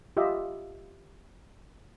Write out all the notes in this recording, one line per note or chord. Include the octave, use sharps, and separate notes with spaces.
F4 G4 D#5 E5